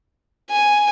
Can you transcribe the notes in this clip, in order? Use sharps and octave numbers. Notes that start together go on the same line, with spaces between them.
G#5